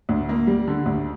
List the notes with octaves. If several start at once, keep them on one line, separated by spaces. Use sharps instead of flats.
D2
A#3
G3
D3
D2